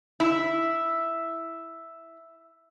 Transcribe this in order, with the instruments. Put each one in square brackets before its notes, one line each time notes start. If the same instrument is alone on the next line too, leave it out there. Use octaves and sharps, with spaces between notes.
[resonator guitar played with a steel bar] E4 [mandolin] E5